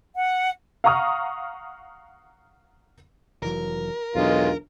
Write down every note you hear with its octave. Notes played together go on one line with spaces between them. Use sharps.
F#5
F5 F#5 A#5 C#6 D#6 F6
F1 E3 F#3 A#4
B1 E2 D#3 G#3 D4 F4